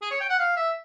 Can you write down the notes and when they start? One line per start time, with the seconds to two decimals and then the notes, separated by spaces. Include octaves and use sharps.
0.02 G#4
0.11 C#5
0.20 G5
0.29 F#5
0.39 F5
0.57 E5